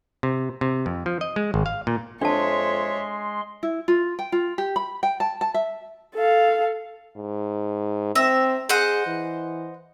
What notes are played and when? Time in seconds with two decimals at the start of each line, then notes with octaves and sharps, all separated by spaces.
0.23 C3
0.61 C3
0.86 F2
1.06 F3
1.21 D#5
1.36 G#3
1.54 G#1
1.66 F5
1.87 A#2
2.21 F2 G#3 D4 C#5 E5 A5 C6
3.63 E4
3.88 F4
4.19 G5
4.32 F4
4.58 G4
4.76 B5
5.03 G5
5.20 A5
5.41 A5
5.54 E5
6.15 A4 F5
7.17 G#2
8.15 C4 E5 A#5
8.69 G#4 C5 D#5 F#5
9.07 E3